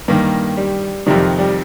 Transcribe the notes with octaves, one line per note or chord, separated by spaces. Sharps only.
G2 D#3 A#3
G3
F2 C3 D#3 G3
G3